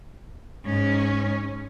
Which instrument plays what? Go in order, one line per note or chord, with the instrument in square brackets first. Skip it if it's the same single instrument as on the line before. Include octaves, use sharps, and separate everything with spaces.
[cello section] G#2 C#4